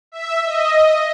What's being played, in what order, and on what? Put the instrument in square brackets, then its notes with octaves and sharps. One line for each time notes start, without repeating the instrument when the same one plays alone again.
[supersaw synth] E5
D#5